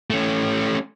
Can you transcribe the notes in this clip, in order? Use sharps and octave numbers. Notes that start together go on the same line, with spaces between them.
A3 C#4